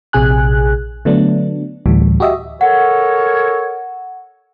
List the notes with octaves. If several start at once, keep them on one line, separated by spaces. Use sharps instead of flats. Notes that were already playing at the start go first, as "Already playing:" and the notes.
A#1 C3 G#4 G#5 F#6
D3 F#3 A3 B3 D4
D2 A2 E3 G3
F#4 G4 D#5 E5
A4 A#4 C#5 F#5